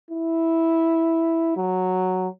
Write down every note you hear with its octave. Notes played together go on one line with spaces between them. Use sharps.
E4
F#3